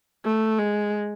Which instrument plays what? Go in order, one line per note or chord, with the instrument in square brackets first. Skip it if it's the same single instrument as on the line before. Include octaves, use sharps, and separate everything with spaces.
[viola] A3
G#3